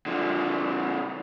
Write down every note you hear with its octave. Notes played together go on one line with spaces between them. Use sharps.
D3 F3